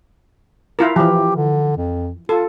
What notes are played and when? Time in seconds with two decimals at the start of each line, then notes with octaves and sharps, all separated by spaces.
0.79 E4 F4 A#4
0.96 E3 F3 G4
1.36 D3
1.77 F2
2.29 F4 A4